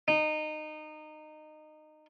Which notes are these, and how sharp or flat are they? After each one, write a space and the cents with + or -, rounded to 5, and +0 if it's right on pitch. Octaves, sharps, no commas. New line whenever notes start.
D#4 -20